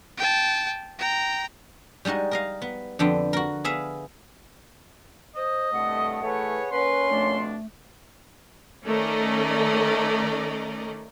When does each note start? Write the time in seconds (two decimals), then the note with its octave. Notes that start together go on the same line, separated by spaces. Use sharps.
0.17 G5 A5
0.99 G5 A#5
2.05 G3 G#3 D#4 F#4 D#5
2.31 A#4 D#5 F5
2.62 B3
2.99 F2 D3 B3 D4 G5 C6
3.33 F#4 A#4
3.64 B3 G#4 E5 F5
5.36 C5 D#5
5.73 C2 G2 A3 F#5
6.23 E3 A3 G#4 B4 C#5
6.72 A#3 C#4 B4 C6
7.10 F2 B2 A3 D4
8.84 D#3 A3 C#4 A#4 D5 D#5